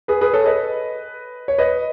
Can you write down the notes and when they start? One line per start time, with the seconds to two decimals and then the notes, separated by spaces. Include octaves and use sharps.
0.08 G#4 B4
0.21 G#4 B4
0.33 A4 C#5
0.46 B4 D#5
1.48 C#5
1.58 B4 D#5